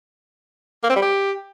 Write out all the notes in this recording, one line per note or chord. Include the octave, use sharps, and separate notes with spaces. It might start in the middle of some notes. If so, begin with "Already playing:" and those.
A#3
C4
G3
G4